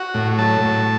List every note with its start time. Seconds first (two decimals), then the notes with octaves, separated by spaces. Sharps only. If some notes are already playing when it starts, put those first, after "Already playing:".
Already playing: F#4
0.14 A2
0.38 F#3 A5
0.61 A2